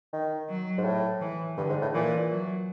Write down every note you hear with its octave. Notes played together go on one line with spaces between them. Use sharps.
D#3
F#3
G#2
A2
E3
G2 D3
G#2
A2
A#2 E3
F#3